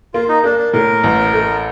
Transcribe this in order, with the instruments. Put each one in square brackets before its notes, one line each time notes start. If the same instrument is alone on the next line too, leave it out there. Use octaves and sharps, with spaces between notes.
[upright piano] A#3 [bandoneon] F4
[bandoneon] D#4
[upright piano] A#3 [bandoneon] D4
[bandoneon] D4
[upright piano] A2 [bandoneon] A#4
[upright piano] A1
A3